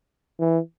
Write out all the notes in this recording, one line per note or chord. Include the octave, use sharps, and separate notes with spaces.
E3